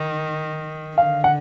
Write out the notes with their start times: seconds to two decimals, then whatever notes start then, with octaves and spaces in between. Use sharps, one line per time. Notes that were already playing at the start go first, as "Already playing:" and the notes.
Already playing: D#3
0.98 D3 F5
1.24 F#5